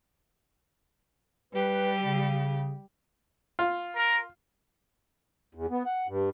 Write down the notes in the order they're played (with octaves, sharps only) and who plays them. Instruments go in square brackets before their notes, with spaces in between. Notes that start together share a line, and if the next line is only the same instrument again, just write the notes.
[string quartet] G3 G4 [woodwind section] B4
[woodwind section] C#3
[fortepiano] F4
[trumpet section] A#4
[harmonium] E2
B3
F#5
G2